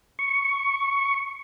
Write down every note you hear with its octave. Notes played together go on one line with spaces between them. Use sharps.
C#6